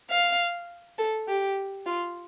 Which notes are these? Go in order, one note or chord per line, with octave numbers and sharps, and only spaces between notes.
F5
A4
G4
F4